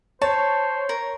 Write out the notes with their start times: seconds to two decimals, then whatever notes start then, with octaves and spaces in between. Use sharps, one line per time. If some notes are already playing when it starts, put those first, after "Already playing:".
0.22 C5 C#5 A5
0.89 A#4